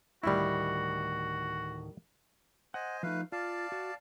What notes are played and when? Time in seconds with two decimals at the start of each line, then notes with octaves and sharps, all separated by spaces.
0.23 D2 A2 D#3 G3 E4 F#4
2.74 C5 D#5 F#5 G#5
3.03 F3 A3 D#4 B4 F5
3.32 F4 D5 F5 A5
3.72 F#4